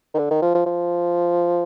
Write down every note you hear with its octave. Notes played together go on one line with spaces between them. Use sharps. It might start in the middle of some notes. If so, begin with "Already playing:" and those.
D#3
D3
D#3
F3
F3
F3